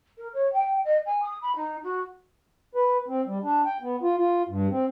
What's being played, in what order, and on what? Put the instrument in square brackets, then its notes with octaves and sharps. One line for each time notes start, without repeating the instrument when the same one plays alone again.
[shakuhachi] A#4
C#5
G5
D#5
G#5
D#6
B5
D#4
F#4
[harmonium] B4
C4
G3
D4
G5
B3
F4
F4
G2
C4